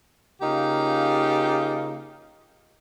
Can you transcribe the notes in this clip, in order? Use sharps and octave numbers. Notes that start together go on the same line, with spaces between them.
C#3 A#3 D#4 F4 G4